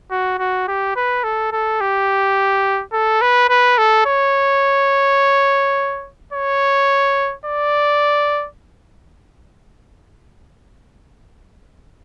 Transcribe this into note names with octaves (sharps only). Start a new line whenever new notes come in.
F#4
F#4
G4
B4
A4
A4
G4
A4
B4
B4
A4
C#5
C#5
D5